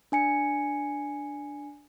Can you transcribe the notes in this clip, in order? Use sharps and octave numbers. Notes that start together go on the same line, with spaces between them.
D4 G#5 C#7